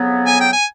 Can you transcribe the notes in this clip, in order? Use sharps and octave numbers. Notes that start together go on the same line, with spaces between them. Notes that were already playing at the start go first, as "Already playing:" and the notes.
Already playing: F2 C#3 F#3 B3
G#5
G5
G#5